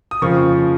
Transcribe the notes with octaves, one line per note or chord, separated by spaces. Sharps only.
D#6
F2 C#3 F3 A#3 C#6